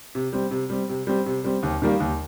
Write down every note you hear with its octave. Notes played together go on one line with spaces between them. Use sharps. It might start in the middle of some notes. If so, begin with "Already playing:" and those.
C3
G3 C4
C3
G3 C4
C3
G3 C4
C3
G3 C4
D#2
D#3 G3 A#3
D#2